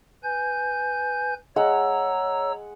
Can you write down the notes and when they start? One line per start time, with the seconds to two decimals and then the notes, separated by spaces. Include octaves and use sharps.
0.23 B4 G#5 G6
1.56 G#3 C#5 F#5 A#5 E6